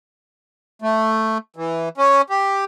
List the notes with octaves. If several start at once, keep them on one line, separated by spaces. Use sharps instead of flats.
A3
E3
C#4
G4